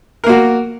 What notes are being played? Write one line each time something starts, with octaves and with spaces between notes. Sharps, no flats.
A#3 F#4 A#4